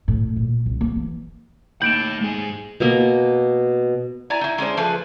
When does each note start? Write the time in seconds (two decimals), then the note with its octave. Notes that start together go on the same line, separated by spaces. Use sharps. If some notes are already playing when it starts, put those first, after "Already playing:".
0.08 A2
0.37 A#2
0.66 C2
0.81 A#3
0.96 E3
1.82 D#2 A3 B5 G6 D7 E7
2.21 G#2 G#4
2.80 B2 A#3 B3
4.30 E4 D5 G#5 A#5
4.41 D#4 E4
4.58 G#3 C#4 D4 C5
4.77 F3 A3 G#4 B4